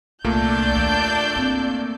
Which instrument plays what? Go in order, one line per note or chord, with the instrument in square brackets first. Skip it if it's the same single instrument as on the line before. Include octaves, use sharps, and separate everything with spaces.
[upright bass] C2 [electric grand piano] A#2 A3 A#3 [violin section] D4 D5 G6
[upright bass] D#2 D#3
C4 E4